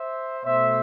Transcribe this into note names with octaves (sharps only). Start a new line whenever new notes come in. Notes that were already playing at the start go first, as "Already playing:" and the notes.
Already playing: C5 E5
B2 A3 C5 E5